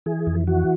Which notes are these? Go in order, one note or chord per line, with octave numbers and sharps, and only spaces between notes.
E3 G#4
F2
E3 F#4